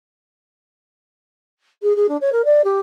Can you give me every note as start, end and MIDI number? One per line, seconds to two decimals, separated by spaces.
1.82 1.95 68
1.96 2.07 68
2.09 2.17 62
2.21 2.30 73
2.32 2.45 70
2.45 2.61 74
2.64 2.80 67